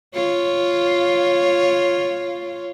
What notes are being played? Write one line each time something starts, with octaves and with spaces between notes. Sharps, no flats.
F4 C#5